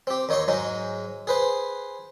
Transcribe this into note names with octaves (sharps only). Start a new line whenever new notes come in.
C4 G4
D#2 D#4 C#5 D#5 C6 C#6
G#2 F#3 G#3 D#4
G#4 B4 C5